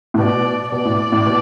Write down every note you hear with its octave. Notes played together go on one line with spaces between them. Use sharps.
A2
B2 D5
B2 D5
A2
A2
B2